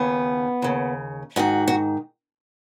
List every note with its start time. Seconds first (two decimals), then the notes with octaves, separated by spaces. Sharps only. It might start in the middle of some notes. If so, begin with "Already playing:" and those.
Already playing: D#2 C#3 B3
0.62 D#2 C#3
1.36 G#2 D#3 F#4
1.68 F#4